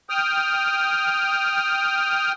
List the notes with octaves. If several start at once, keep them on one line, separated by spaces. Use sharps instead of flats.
G5 D#6 F6